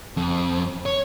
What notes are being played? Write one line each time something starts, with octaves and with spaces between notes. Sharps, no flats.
F2
C#5